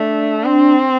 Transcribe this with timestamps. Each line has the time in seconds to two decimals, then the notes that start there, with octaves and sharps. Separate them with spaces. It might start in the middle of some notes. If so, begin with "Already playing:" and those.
Already playing: A3 D4
0.44 C4